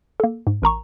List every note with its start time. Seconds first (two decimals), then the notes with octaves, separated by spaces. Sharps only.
0.20 A#3 A4
0.47 G#2
0.62 A1 A#4 A#5 C#6